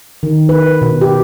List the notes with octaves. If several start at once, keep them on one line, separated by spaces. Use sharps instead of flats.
D#3
B4
B2
G4